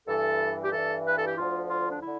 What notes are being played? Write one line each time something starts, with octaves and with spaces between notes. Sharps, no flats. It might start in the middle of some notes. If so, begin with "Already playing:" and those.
G2 E3 A4
G4
G2 E3 A4
B4
A4
G4
D2 D3 F3 F4
F4
D4
D3 E4